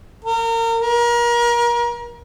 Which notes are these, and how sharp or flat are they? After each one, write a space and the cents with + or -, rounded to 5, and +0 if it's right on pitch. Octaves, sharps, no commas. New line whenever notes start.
A#4 -30
A#4 +35